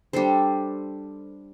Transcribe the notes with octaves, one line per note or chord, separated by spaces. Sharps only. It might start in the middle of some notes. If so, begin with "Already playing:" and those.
G3 D4 A4 C5